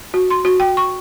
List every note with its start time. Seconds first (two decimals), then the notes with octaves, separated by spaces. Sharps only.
0.14 F#4
0.30 C6
0.45 F#4
0.60 G5
0.77 C#6